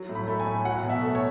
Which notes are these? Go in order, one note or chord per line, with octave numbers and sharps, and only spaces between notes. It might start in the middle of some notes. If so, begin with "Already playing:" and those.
Already playing: F#3
A2
B5
A3
G#5
A2
F#3 F#5
B2
E5
A3
C#5